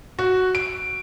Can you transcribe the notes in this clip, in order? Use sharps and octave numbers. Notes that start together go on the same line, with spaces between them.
F#4
D7